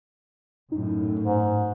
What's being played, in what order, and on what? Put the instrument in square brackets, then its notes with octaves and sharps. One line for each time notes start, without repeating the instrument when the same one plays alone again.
[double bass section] F#2 A2 [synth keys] D#4
[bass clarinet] G#2